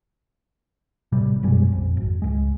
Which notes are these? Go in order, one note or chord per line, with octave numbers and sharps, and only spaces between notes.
A#1 A2 C3 G3
F#2 B2 G3 G#3
A#1 F2
G#1
C#2 G#3